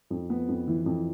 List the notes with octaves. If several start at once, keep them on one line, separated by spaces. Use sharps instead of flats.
F2
B3
F2
E3
F2